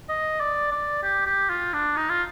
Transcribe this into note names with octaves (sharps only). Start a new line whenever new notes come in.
D#5
D5
D5
G4
G4
F4
D4
D#4
F4